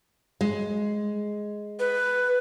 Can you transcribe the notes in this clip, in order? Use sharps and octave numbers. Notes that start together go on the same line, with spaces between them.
G#3
B4